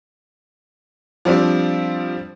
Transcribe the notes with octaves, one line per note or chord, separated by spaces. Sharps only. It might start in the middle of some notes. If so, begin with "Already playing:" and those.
F3 G3 C4 D4